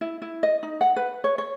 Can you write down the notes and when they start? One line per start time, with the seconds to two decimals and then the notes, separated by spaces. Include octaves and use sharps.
0.01 E4
0.22 E4
0.43 D#5
0.63 D#4
0.81 F#5
0.96 B4
1.24 C#5
1.38 C#5